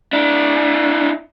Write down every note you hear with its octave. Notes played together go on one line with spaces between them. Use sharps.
D4 E4